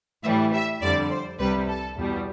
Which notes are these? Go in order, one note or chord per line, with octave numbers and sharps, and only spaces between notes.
A2 E3 G3 E5
E5
F2 D3 G3 D5
C5
C2 C3 G3 B4
A4
E2 B2 G3